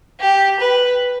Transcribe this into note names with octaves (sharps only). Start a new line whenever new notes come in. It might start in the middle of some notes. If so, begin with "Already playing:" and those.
G4
B4